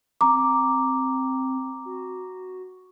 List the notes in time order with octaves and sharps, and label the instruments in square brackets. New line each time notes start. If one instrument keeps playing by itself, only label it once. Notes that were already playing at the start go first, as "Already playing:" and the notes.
[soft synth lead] C4 [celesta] A#5 D6
[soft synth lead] F#4